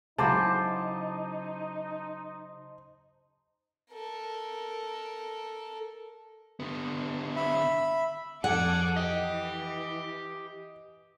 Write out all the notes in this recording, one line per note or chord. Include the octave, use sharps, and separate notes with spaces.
C#3 F#3 D#4 E4 C5 A5 D6
A4 A#4
D3 B3
E5 B5
F2 G#4 A4 F#5 D6
E3 G4 D#5